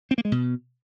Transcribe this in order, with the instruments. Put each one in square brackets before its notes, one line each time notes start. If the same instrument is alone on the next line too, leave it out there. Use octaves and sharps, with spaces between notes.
[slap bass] C4
A#3
G#3
B2